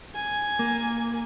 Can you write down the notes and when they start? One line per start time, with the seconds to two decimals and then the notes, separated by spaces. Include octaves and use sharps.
0.15 G#5
0.59 A#3